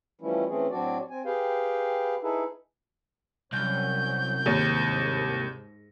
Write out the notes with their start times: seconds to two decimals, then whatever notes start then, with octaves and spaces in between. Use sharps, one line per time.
0.21 E3 F3 G3 A3 C#4 E4
0.49 E3 A3 C4 C#4 G#4
0.71 A2 F#3 C4 D4 F#4 D5
1.10 C4 G#5
1.25 G4 G#4 B4 F5 G5
2.23 D#4 E4 G#4 A4 B4
3.53 C2 F#3 C#4 G6
4.46 D#2 G#2